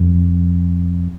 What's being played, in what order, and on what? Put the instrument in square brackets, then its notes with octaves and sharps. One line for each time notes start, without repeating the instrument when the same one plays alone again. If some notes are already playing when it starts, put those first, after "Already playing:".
Already playing: [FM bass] F2